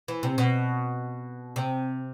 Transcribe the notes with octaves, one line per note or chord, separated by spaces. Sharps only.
E3
C3
B2
C3